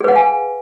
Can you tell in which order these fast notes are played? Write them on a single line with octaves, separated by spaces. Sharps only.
G#4 B4 F#5 F5 G#5